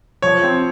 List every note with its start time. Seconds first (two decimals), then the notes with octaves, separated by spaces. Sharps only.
0.22 F3 C#5
0.44 C4